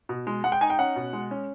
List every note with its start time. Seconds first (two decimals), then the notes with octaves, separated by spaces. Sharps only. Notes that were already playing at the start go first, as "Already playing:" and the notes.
0.09 B2
0.27 G#3
0.44 G#3 F#5
0.52 G5
0.61 D#4 G#5
0.70 G5
0.78 C#4 F#5
0.96 B2
1.13 G#3
1.31 C#4